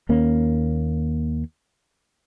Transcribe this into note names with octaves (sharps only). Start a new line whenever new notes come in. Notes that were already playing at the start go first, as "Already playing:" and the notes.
D#2 A#3 C#4